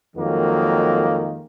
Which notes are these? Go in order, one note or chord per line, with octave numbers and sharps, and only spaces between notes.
F2 D#3 F#3 G#3 A#3